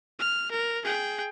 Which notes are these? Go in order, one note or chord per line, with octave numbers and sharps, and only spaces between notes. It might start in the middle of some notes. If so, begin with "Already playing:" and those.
F6
A#4
G#4 G5